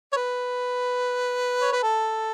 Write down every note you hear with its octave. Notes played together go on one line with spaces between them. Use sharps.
C#5
B4
C#5
B4
A4